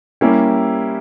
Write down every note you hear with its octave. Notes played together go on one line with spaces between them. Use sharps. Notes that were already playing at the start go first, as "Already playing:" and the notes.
G3 A#3 C#4 E4 G4